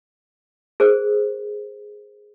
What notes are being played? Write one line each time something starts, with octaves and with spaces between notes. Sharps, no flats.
G#4 A#4 C5